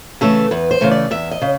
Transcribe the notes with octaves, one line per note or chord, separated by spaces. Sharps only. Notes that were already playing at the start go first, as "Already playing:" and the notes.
C#3 E3 A3 A4
E2 B4
C5
C#3 E3 A3
D5
E2 E5
D#5
C#3